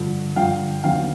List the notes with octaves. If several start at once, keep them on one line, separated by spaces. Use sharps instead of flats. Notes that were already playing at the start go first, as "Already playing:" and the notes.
Already playing: G2 D3 F3
G2 D3 F3 F5 G5
D#2 D3 F#3 B3 F5 G5